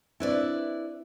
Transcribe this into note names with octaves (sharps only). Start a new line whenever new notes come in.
C4 D4 E4 B4 C5 D5